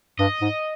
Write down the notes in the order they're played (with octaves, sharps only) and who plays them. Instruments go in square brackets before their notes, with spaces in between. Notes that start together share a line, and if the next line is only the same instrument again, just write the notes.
[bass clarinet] G2 [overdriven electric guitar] D#5
[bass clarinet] G#2